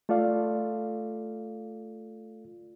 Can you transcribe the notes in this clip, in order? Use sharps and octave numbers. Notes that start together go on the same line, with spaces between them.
A3 F4 A4 D5 F5